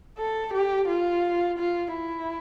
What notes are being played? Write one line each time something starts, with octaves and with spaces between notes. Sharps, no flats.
A4
G4
F4
F4
E4